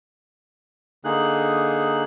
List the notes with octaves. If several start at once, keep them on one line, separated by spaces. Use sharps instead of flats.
D3 A#3 D#4 G#4 F#6